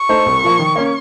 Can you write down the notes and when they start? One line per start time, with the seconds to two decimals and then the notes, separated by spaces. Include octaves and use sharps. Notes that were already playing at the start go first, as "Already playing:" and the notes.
Already playing: C#6
0.09 A3 D#4 A4 C5
0.26 C2
0.42 A#2 F3 A#3
0.59 D#3
0.76 A#3 C#4